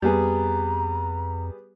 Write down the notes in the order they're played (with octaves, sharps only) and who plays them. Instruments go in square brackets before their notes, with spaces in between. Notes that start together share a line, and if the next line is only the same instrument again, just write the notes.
[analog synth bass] F2 [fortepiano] G3 B3 G#4 [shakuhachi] A#5